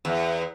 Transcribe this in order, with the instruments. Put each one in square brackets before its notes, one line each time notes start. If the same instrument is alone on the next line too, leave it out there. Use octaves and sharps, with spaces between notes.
[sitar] E2